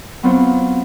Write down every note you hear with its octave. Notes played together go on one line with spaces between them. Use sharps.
F#3 B3 C4 F4 C5